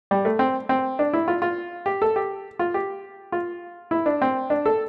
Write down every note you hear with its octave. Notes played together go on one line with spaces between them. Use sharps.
G3
A3
C4
C4
D4
E4
F4
F4
G4
A4
G4
F4
G4
F4
E4
D4
C4
D4
A4